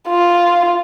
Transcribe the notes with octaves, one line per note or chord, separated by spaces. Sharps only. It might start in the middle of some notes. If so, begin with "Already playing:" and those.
F4